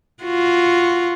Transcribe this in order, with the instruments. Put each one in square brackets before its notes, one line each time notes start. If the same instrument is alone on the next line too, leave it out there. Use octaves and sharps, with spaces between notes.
[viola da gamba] F4 F#4